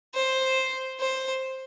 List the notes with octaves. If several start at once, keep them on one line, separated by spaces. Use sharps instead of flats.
C5
C5